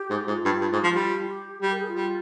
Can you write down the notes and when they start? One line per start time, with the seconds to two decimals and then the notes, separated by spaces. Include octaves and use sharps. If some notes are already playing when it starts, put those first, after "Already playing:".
Already playing: G4
0.10 G#2
0.28 G#2 F4
0.45 G2
0.61 G2
0.73 G#2
0.84 F3
0.95 G3
1.29 G4
1.62 G3 G4
1.71 A#4
1.80 G#4
1.88 F4
1.96 G3